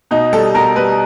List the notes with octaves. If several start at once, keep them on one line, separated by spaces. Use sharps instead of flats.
B2 D#4
G3 A4
B2 A#4
G3 B4